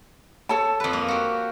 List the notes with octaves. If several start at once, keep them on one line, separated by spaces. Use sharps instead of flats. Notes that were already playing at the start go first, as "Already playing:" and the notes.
A4 C#5 A5
F2 B4
A#3
F#4 G4